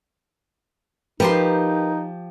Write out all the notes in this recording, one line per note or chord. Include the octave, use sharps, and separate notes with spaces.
F3 D#4 G4 A#4 B4 G5 C6